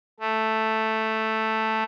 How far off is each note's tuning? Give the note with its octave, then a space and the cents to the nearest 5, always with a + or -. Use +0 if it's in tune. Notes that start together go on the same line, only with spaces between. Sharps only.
A3 +0